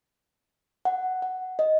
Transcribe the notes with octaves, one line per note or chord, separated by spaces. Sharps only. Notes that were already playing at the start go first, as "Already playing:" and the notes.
F#5
F#5
D#5